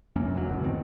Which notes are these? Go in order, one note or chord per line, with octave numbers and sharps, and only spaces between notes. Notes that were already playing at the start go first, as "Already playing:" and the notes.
F1 F#2 A#3 C#4
F1 D#2 A2 F#3
F#1 C#2 A2
D#3 C4